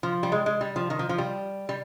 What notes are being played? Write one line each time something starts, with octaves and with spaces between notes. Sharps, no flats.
F3
G3
G#3
G#3
G3
F3
D#3
F3
F3
G3
G3